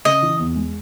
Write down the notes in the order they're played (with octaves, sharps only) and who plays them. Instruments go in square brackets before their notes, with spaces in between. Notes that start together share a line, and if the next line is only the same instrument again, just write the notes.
[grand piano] C#3 [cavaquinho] D#5
[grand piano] E3
E2
G#3